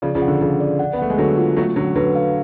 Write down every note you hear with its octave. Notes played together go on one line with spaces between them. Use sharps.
C#3 F3 D5
C#3 F3
F#5
D3
C#3 F3 G#4
D5
F#5
B3
A3 F#5
G#3
D3 F#3 A4
F4
F#3 A3 C#4
D3 F#3 C#4
D3 F#3 B4
F5